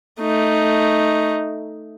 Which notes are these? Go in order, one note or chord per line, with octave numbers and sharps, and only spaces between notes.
A3 D#4